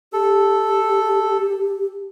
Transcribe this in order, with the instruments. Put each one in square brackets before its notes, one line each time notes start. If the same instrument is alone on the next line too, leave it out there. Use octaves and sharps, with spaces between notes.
[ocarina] G4 [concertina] A4